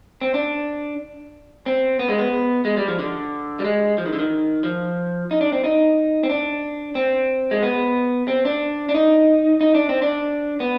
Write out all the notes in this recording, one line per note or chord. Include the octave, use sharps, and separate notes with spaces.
C4
D4
C4
B3
G#3
B3
G#3
G3
F3
D3
G3
G#3
F3
D#3
D3
D#3
F3
D#4
D4
C4
D#4
C4
D4
C4
G#3
B3
C4
D4
D4
D#4
D#4
D4
C4
D4
B3